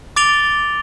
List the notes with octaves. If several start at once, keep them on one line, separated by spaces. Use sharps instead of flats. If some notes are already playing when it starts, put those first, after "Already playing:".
D6 A6 D7 F7 G7